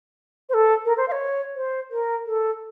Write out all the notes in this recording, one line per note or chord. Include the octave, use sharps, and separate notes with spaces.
C5
A4
A#4
C5
F5
C#5
C5
A#4
A4